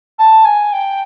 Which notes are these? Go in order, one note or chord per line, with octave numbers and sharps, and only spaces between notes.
A5
G#5
G5